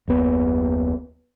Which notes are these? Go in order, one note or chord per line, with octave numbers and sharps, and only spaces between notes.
F#1 D#2 B3